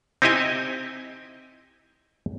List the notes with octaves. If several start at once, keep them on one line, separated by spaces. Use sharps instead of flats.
C4 D#4 E4 G4 D#5 G#5